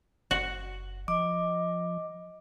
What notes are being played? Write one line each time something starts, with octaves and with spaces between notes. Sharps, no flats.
F#1 F#4
F3 D#5 D6